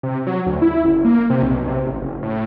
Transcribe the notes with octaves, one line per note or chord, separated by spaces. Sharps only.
C3
F#3
D2
E4
F#1
A#3
C3
B1
C3
A1
F#1
A2